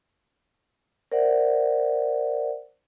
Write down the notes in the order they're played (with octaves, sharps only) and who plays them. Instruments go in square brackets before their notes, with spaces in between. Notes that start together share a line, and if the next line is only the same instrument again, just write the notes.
[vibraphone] A#4 C5 D5 E5 F#5